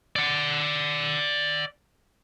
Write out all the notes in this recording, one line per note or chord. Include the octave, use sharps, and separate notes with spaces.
D5 F#5